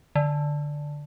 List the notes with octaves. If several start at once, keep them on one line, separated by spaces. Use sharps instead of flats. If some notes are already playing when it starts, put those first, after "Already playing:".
D3